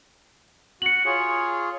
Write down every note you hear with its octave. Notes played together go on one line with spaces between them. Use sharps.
F#4 C#7 F#7
F4 G#4 C#5